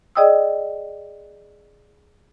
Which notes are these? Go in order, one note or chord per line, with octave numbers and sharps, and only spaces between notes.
G#4 D5 D#5 G5 D#6 E6